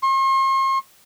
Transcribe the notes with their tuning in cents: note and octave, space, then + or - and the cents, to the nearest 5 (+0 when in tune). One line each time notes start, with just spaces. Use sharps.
C6 +45